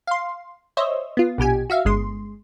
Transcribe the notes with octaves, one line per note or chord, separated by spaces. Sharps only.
F5 C6
C5 C#5 D#5 E5
B3 F4
A#1 B2 G4 G#5
F#4 E5 F5
G1 G#3 C6